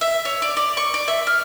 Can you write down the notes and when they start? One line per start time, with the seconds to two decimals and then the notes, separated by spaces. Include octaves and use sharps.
0.01 E5
0.25 C#5
0.42 D5
0.57 D5
0.77 C#6
0.94 D5
1.08 E5
1.27 F6